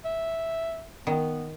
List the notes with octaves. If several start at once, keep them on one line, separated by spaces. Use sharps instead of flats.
E5
D#3 B3